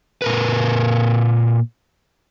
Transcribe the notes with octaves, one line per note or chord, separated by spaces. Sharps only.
A#2 A#4 B4